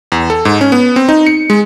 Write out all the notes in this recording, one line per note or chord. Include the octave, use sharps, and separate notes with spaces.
E2
A4
G#2
C#4
B3
C4
D#4
C#7
G#3